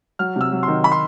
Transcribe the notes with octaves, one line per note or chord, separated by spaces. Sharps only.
F#3 F6
C3 E6
F#3
D#3 C6
B5
C6